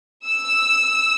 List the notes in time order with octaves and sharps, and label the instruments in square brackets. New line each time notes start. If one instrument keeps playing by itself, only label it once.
[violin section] E6